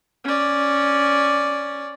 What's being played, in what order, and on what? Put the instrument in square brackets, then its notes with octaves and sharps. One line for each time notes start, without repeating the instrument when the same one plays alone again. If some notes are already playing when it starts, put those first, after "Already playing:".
[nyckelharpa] C#4 D5